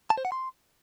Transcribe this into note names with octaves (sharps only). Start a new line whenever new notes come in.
A5
C5
F#5
C6